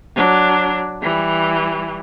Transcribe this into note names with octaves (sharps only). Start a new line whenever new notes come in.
F#3 D4
E3 G3